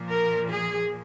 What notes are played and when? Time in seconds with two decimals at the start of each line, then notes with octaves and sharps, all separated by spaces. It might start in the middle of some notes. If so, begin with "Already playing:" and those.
Already playing: A#2 F3 A#3
0.10 A#4
0.49 G#4